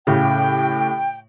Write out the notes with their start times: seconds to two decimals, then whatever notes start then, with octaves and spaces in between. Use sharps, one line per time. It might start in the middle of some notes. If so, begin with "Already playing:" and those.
0.07 A2 C#3 G4 G5